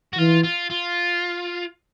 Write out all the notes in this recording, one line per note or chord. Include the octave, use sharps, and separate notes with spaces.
F#4
E3 F4
F4
F4